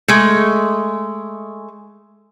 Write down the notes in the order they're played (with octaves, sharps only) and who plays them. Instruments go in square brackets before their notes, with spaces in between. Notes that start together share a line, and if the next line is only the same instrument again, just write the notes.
[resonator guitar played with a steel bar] G#3 A3